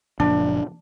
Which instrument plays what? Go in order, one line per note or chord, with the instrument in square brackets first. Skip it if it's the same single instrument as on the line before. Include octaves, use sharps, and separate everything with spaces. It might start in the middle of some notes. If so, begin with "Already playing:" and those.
[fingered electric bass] F#1 A#2 F3 [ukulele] D4